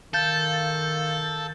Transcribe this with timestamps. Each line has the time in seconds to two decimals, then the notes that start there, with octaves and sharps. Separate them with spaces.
0.14 D#3 A4 F5 G6 A6